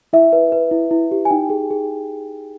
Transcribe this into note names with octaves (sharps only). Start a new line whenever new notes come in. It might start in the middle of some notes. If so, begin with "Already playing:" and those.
E4 E5
B4
B4
E4
E4
G4
G#5
D#4 G5
G#4
G#4